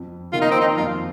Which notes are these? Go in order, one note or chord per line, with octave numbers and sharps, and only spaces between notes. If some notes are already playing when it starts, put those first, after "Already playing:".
Already playing: F2
D#3 A#3 F4
D#4
C4
D#4
F2 F4